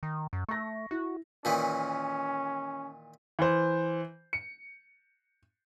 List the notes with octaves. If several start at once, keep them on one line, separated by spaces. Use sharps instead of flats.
D#3
F#2
A3 C#6 A#6
E4 F#4
A#2 D#3 E3 C#4
E3 C5
C#7